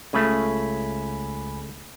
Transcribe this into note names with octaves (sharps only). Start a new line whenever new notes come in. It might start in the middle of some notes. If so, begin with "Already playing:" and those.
C#2 C#3 A3 G#5 B5